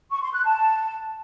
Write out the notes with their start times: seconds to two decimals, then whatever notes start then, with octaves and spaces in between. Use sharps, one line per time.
0.11 C#6
0.22 C6
0.33 F#6
0.45 A5